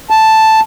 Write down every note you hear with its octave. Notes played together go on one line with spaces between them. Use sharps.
A5